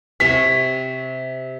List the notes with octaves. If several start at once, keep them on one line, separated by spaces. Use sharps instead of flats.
C3 C#5 B6